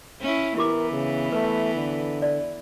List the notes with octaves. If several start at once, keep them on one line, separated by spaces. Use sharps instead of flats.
C#4 E4
E3 B3 E4 G4 A#4 D6
C#3
A3 B4
D3
D5